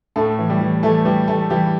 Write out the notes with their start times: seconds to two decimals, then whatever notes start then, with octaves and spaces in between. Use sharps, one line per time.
0.16 A2 A3 A4
0.39 E3
0.49 G3 G4
0.61 E3
0.83 E3 A3 A4
1.05 E3 G3 G4
1.28 E3 A3 A4
1.50 E3 G3 G4